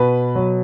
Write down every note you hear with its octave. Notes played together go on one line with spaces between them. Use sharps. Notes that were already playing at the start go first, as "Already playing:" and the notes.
Already playing: B2 B4
F#3